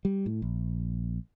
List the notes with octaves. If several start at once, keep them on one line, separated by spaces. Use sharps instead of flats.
G3
A2
A#1